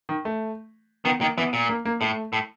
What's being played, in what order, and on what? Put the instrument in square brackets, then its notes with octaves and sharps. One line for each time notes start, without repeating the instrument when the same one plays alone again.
[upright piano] D#3
A3
[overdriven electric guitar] D#3 [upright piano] B3
[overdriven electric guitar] D#3 [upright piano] A#3
[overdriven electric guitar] E3 [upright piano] B3
[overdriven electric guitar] A#2
[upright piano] A#3
A#3
[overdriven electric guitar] A2 [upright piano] A3
[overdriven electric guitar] A2